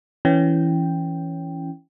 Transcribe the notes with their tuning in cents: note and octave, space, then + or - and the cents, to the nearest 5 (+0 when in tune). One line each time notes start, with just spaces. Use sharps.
E3 +0 C#4 +0 G5 +0